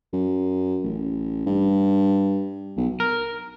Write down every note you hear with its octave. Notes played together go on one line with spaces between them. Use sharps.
F#2
A1
G2
B1
A#4